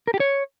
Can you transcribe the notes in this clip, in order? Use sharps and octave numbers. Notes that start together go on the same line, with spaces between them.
A#4
G4
C#5